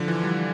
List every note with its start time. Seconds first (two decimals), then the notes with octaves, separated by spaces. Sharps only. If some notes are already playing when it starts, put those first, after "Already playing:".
Already playing: D3 F3
0.08 E3
0.23 G3